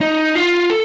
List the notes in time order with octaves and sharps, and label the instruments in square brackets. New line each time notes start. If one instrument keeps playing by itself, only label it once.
[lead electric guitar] D#4
F4
A4